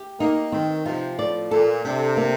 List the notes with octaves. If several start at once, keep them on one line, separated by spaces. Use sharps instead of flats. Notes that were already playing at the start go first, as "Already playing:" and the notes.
Already playing: G4
A#3 D#4
D#3 C4
C3 F3
A2 D5
A#2 A4
C3 D4
A#3